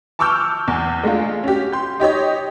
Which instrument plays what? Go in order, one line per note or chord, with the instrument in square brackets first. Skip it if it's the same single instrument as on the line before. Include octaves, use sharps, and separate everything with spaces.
[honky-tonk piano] A5 C#6 D6 E6 F6 G6
E2
G#3 A3 D4 F4
C#4 F#4 G4
C6 G6
D#4 G4 C#5 D#5